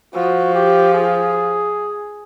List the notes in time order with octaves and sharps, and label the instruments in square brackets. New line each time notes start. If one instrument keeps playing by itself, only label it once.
[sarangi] F3 [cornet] F#4
[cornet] G4
G#4